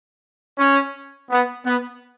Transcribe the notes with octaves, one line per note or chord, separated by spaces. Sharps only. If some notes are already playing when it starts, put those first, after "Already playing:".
C#4
B3
B3